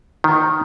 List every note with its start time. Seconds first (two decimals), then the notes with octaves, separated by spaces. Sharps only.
0.24 D#3